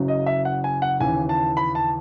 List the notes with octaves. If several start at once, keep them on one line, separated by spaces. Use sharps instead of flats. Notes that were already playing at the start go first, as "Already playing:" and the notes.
Already playing: F#1 F#2 C#3 F#3
D#5
E5
F#5
G#5
F#5
D#2 C#3 E3 G#5
A5
B5
A5